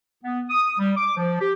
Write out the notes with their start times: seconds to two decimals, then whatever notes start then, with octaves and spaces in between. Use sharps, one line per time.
0.24 B3
0.50 D#6
0.79 G3
0.96 D6
1.17 F3
1.40 G4